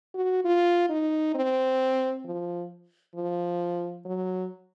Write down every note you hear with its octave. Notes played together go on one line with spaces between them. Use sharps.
F#4
F4
D#4
C4
F3
F3
F#3